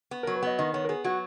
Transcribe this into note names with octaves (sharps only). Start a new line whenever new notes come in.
B3
A#4
F#3
B4
B3 D#5
D#3 D#5
B3 C#5
A#4
B3 G#4
F#3 F#4